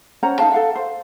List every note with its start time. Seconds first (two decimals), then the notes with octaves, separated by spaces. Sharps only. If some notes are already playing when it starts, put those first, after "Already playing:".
0.23 C#4 C5 F#5 A#5
0.39 D#4 A#4 F5 A5
0.52 A4 F5 F#5
0.75 C5